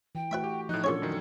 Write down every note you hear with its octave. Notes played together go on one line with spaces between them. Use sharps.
E3 G5
A3 F#4 B4 E5 B5
G4
A2 F3 D#4 F#6
A#2 C#4 D4 G#4 A4 C#5 G#6
F#2 D#3